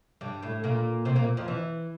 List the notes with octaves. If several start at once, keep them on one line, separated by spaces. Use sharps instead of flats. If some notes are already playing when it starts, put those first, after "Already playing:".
G2 G3
A2 A3
A#2 A#3
C3 C4
A#2 A#3
F2 F3
E3